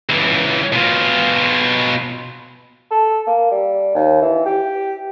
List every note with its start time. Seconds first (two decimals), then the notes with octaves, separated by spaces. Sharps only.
0.09 C#2 E3
0.72 B2 F4
2.91 A4
3.27 A#3
3.51 G3
3.95 D#2
4.22 E3
4.46 G4